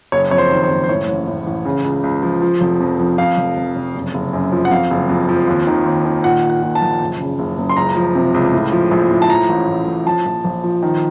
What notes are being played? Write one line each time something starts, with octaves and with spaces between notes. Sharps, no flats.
F#1 C#5
F2 C#5
C5
D#3
C#5
F#1
C5
A2 C#5
A1
A2
A1
C#3
C#2
C#2
F3
F3
F1
F2
F2
F2 F5
F1
F1
F1
F#1
F#1
F#2
F3
F#5
F2 F5
F#1
F2
F3
D#2
D#3
D#2
D#3
A#2 F#5
A#2
F#5
A#2
A5
A#1
F#1
C#3
F#1
F#1
C6
C#2 A#5
F3
C3
C#2
A2
F3
A#1
A2
A5
F3 A#5
A1
A1
A1
F3 A5
A#1
A#1
F3
D#3